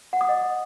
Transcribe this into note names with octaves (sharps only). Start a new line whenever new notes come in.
F#5
D#6
D#5